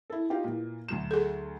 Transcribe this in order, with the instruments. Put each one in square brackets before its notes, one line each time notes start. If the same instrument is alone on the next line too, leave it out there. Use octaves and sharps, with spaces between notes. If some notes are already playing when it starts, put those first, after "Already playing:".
[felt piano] E4 A4
D#4 F4 G4
A#2 E3
D2 F#3 E7
[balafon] G#4 A4